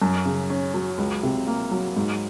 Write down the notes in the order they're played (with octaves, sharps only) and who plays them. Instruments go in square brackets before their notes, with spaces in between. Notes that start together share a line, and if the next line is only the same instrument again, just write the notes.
[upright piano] F#2
C#3
C#4
F#3
C#2
C3
A#3
F#3
G#2